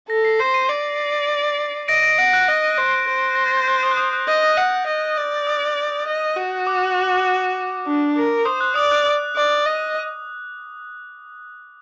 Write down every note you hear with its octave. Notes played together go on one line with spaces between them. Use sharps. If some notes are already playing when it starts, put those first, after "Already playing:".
A4 A#6
C7
C5 C7
C7 D#7
D5
D#5 A#6 D7
A#6 D7
F#5 A#6 D7
F#6
D#5
C5
C5
A#6
A6
G6
F#6
D#6
F#6
D#6
F#6
D#5 G6
F#5
D#5
D5
D#6
D#5
F#4
D6
D4
A#4
C5 D#6
F#6
D5 D#6
F#6
D#6
D5
D#5